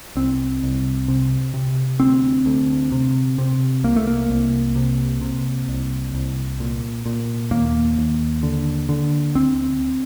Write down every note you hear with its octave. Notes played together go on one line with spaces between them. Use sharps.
C2 C4
C2
C3
C3
D2 C4
D2
C3
C3
C2 A#3
A3
A#3
C2
C3
C3
C2
C2
A#2
A#2
D#2 A#3
D#2
D3
D3
D2 C4